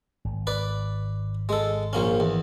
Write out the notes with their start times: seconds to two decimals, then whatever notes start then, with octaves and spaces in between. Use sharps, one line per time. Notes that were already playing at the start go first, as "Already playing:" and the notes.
0.25 G#1
0.47 B4 D5
1.49 G#3 A4
1.93 A#1 A#3 C#4
2.20 E2